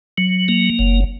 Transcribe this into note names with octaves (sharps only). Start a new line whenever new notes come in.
F#3
A#3
F#1